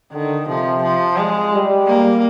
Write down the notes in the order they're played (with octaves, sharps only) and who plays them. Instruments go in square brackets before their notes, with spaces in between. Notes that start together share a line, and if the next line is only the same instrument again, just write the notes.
[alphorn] D3 [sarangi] D#3
[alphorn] C3 [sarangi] F3
[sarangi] F3
G#3
[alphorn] G3
[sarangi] A#3